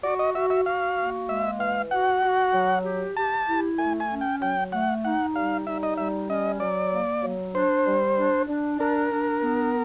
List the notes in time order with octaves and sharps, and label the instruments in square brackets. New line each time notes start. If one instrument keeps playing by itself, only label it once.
[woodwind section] F#4 [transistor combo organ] D5
[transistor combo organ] D#5
[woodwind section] F#4 [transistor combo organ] E5
[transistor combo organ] E5
[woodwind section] F#4 [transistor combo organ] F5
[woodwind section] A#3
[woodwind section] G#3 [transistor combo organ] E5
[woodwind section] E3 [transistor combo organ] F5
[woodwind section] F#4 [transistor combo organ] F#5
[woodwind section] F#4
F#3
G4
[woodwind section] G4 [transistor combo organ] A5
[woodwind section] E4
[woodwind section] A3 [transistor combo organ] G#5
[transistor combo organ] G#5
[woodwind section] C#4
[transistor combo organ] G5
[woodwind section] F#3 [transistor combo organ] G5
[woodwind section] A3 [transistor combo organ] F#5
[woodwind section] D#4 [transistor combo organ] F#5
[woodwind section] G3 [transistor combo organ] F5
[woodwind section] D#4 [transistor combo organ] E5
[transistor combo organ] D#5
[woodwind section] G3 [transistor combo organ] E5
[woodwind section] C#4 [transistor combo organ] D#5
[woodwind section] F#3 [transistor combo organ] D5
[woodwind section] A#3
F#3
[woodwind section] D4 [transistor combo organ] C5
[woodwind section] G3
D4
D4
[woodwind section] D4 [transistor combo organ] A#4
[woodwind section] D4
B3